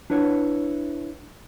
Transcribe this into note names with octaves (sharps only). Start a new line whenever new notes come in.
D4 E4 B4 C#5